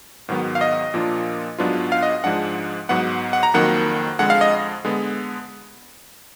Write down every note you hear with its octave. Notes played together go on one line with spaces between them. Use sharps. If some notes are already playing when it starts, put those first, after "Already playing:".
G#2 D#3 F#3 B3
F5
D#5
A#2 F3 A#3 D4 F4
G#2 F#3 B3 D4 F4
F5
D#5
G#2 F3 G#3 D4 F#5
G#2 F#3 B3 F#5
F#5
A#5
F2 D#3 F#3 A#3 F#5
F2 D3 G#3 F#5
F5
D#5
D3 G#3 B3